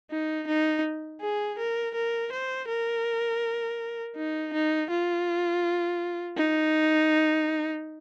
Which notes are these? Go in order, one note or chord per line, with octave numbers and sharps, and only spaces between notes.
D#4
D#4
G#4
A#4
A#4
C5
A#4
D#4
D#4
F4
D#4